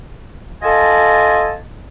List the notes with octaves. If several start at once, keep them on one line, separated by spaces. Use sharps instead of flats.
F4 A4 D#5 G#5 A5